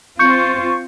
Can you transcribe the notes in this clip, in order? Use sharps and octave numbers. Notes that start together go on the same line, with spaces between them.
C4 F4 C5 C#6 G6 C#7